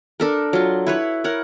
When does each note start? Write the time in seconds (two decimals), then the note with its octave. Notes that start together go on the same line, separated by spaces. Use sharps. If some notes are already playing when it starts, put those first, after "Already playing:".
0.20 D4 A4 A#4
0.53 F#3 F4
0.87 E4 B4 C#5
1.24 A#4 C#5 F#5